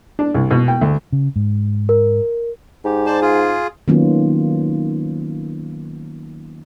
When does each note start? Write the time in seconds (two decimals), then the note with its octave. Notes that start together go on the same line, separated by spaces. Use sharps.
0.19 D4
0.34 C2
0.51 B2
0.68 G5
0.81 D2
1.12 C#3
1.36 G#2
1.89 A#4
2.85 G#2 G4
3.06 C5 D5 A5
3.22 F4 G#4
3.88 D#3 F#3 A#3 B3 C#4 F4